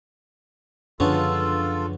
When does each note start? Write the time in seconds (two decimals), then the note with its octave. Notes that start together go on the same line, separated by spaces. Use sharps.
1.00 C#2 F#2 D3 F3 B3 C#4 F4 A4